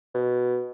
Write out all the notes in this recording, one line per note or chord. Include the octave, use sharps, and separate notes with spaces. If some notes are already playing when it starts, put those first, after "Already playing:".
B2